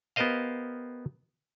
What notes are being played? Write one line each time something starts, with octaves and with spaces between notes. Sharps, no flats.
B3 G4 A#4 C5 D#5 F5